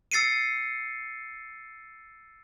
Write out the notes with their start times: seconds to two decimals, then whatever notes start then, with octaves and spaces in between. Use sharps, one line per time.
0.12 E6 A6 C7 C#7 D#7